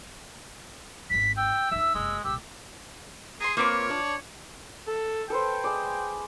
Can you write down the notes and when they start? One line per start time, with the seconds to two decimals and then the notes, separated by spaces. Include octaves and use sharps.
1.10 G#1 E2 B6
1.37 G5 E6
1.71 D#2 D3 E5
1.95 F#1 C3 G#3
2.24 C2 A#2 G4 E6
3.41 G#4 A#5 C6
3.57 A#3 C4 F4 B4 C#5 D6
3.90 D4
4.87 A4
5.30 A4 B4 C5 G5
5.64 G#3 D5